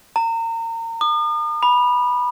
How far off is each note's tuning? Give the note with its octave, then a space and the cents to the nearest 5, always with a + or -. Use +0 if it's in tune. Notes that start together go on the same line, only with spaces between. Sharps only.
A#5 -30
D#6 -45
B5 -10